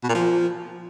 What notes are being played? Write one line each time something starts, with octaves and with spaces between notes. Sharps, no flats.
B2
A#2
F3